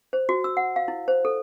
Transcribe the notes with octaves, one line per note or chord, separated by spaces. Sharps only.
C5
F#4
E6
F#5
F5
E4
C5
A4